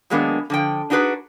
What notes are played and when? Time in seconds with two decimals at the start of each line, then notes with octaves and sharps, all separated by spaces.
0.10 D#3 F#3 G#3 A#3 B3 D4
0.50 D3 F3 G5
0.90 D4 D#4 F#4 G#4 B4 D5